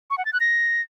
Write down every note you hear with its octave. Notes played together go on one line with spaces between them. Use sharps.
C#6
F#5
A6
F#6
A#6